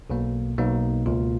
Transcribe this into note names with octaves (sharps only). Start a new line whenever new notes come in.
B1 B2 A#3
B1 B2 A#3 D#4
C#2 B2 A#3 F4